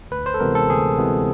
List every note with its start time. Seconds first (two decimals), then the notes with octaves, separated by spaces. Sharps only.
0.11 D2 B4
0.26 C5
0.34 A4
0.40 C3 E3 G#3 B3 A#4
0.55 A4
0.70 D2 G#4
0.98 C3 E3 G#3 B3